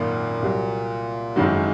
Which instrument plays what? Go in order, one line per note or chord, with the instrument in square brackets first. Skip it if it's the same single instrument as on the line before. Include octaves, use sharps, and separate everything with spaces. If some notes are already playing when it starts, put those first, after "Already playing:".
Already playing: [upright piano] G#1 F#2 D#3 A#3 [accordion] A#2
[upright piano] C2 C3 F#3
[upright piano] F#1 F2 D#3 F#3 [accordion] G#2